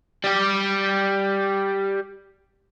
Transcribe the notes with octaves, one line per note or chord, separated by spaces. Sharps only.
G3 G4